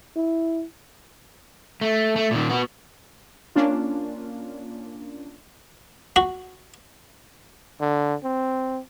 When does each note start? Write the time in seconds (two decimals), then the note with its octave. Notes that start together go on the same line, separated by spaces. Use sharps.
0.16 E4
1.81 A3
2.16 A3
2.31 A#2 D#3
2.49 B3 F#4
3.55 A#3 C#4 D4 F4
6.16 F#4
7.81 D3
8.24 C4